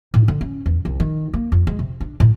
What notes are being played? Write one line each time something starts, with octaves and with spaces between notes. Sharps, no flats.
A2
D3
C#4
E2
C2
D#3
A#3
F2
G#3
C3
D4
A2